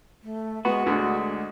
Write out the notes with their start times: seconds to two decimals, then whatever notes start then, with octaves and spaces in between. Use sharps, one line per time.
0.23 A3
0.65 G#3 B3 F#4
0.86 D2 D3 G#3